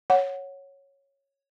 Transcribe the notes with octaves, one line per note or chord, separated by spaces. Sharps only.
C#5 F#5